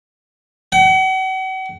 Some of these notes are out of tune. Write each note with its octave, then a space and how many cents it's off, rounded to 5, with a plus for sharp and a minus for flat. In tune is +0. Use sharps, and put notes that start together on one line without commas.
F#5 +40